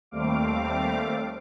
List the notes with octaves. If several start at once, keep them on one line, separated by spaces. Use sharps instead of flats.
D#2 G3 A3 C4 F5 D6